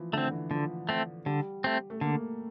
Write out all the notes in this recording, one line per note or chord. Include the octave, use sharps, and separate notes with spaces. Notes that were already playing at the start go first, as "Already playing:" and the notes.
Already playing: E3 F3
D3 A3 C4
D3
E3
D3 F3
A3 C4
D3 G3
A3 C4
A3
D3 A#3